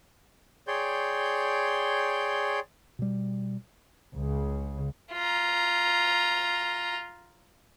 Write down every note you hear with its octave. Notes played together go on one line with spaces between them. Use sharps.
G#4 C#5 D5 G5 C6 G6
B2 G3
C#2 C#3
F4 A#5